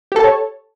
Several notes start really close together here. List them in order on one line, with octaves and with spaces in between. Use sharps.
G4 A4 A5 C#5